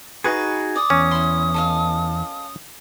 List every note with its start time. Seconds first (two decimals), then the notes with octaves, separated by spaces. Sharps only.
0.24 D#4 F#4 G#4 B4
0.76 D5 D#6
0.90 E2 C#4
1.11 E4 B5 C6
1.54 A4 D#5 F5